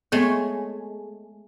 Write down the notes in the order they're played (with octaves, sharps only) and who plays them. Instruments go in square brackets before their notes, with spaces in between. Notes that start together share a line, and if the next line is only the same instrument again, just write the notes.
[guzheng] G#3 A3 C#5 [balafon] B3 C4